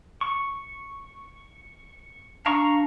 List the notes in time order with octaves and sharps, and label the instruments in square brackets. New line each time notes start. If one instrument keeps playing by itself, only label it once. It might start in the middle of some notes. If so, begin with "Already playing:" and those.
[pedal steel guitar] C#6
[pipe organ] D4 [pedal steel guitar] F5 A#5 C#6